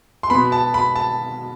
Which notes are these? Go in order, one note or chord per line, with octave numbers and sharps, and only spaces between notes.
C6
B2 B3 B5
A5
B5
A5